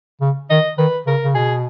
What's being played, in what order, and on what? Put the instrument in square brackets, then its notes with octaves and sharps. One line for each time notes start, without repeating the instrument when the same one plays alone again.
[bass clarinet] C#3
[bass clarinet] D#3 [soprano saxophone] D#5
[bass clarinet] D#3 [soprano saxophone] B4
[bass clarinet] C#3 [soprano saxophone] A#4
[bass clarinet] C#3
[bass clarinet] B2 [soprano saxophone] G#4